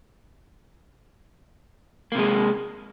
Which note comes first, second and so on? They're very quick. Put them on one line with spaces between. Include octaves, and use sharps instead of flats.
A#3 C3 G#3